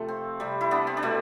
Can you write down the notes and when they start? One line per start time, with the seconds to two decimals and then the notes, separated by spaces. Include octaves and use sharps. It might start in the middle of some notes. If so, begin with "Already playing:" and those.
Already playing: C3 F3 A3
0.08 C4
0.40 C3 G3
0.61 E4
0.71 B3 D4
0.87 C4
0.97 D4
1.03 B2 A3 C4